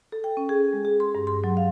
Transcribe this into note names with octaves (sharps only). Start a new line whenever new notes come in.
A4
G5
C#4
G#4
G#3
G#4
C6
G2
C6
F#3
F5